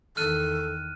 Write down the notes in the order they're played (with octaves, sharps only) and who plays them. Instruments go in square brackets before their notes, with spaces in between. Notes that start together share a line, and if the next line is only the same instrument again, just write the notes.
[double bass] E2 D#3 [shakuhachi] A4 [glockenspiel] F6 F#6 D#7